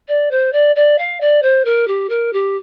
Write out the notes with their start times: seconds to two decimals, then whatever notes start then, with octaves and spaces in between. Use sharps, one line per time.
0.08 D5
0.31 C5
0.52 D5
0.75 D5
0.98 F5
1.20 D5
1.42 C5
1.65 A#4
1.87 G4
2.09 A#4
2.33 G4